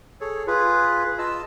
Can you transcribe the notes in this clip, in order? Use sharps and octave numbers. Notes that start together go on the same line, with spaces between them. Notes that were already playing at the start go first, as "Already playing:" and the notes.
G#4 A4 C#5
F4 G#4 B4
F4 D#5 A5 E6